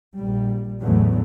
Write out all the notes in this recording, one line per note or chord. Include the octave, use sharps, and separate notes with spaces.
A#1 G3
A1 E2 A2 D3 F#3 A3